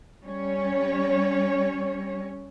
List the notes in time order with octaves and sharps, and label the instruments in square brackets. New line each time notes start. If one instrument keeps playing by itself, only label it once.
[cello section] G3 C#4 C#5